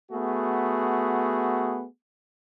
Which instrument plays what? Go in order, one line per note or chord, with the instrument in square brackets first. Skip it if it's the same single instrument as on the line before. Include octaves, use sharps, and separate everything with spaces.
[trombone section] A3 B3 F#4 G#4